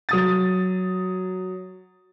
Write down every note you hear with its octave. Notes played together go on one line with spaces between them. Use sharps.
F#3 D#6 A6